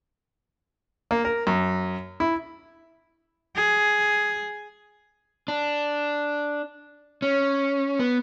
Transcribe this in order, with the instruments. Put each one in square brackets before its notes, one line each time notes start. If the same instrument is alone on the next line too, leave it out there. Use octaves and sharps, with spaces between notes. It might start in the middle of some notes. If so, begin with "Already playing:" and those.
[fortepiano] A#3
A#4
F#2
E4
[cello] G#4
[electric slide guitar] D4
C#4
B3